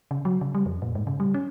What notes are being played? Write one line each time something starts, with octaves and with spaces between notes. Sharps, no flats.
C#3
F#3
C#3
G3
F2
A#2
G#2
C#3
G3
C#4